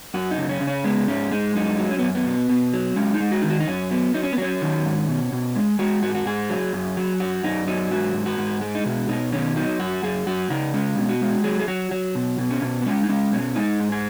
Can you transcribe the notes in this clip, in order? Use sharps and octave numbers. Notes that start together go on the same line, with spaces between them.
F#2 F#4
D#4
C#3
C#4
C#3
C#4
G#3 B3
G#2 C#4
G#3 D#4
F#2 D#4
F#3
C#4
B3
F#2
B3
B2
B2
F#3
G#3 C#4
D#4
G#3
F#4
D#3 D#4
F#4
D#4
F#2 C#4
F#3 B3
F#3 D#4
C#4
B3
F#3 C#4
D#3
G#2
B2
B2
G#3
G#3 F#4
G#2 F#4
F#4
G#2 G#4
F#3
F#2
F#3
F#2 F#4
F#2 D#4
F#3 D#4
G#2 F#4
G#2
F#4
G#2
G#3
D#4
B2 F#4
B2 D#4
D#3 C#4
F#3 D#4
F#2 F#4
F#2 G#4
F#2 F#4
C#3 D#4
G#3 C#4
B2
F#4
G#3
F#3 G#4
G#4
F#3 F#4
F#3
B2
B2
C#4
B2
B3
G#3 C#4
D#4
G#3 C#4
B2 C#4
G#3 D#4
G#2
G#4